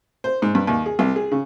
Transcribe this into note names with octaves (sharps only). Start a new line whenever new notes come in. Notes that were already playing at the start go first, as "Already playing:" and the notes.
C5
G#2
G2
D#2
G#4
C2
G#4
C#3